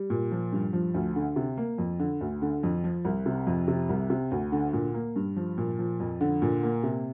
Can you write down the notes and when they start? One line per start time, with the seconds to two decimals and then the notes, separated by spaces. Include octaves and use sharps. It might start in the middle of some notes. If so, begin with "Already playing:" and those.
Already playing: G3
0.10 A#2
0.32 F3
0.52 G2
0.73 F3
0.94 D2
1.16 D3
1.36 C3
1.58 A#3
1.78 F2
2.00 D3
2.21 D2
2.42 D3
2.63 F2
2.84 F3
3.05 C2
3.26 C3
3.47 F2
3.68 C3
3.89 C2
4.10 C3
4.31 D2
4.52 D3
4.73 A#2
4.94 A#3
5.16 G2
5.36 F3
5.58 A#2
5.79 F3
6.00 F2
6.21 D3
6.42 A#2
6.63 A#3
6.84 C3